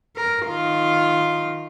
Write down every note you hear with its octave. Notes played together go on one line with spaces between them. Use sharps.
A#4
D#3 F4